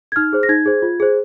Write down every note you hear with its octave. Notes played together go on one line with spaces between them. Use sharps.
G#6
D#4 F6
G#4 C5
A#6
D#4 G#6
G#4 C5
F4
G#4 C5